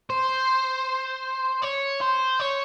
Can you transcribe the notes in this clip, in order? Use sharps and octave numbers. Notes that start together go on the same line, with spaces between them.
C5
C#5
C5
C#5